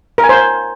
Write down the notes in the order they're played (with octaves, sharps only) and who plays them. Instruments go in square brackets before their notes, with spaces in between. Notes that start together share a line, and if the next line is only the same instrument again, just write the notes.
[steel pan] A#4
G#5
C5